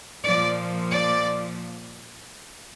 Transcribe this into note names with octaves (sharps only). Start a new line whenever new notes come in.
A#2 F3 D5
D5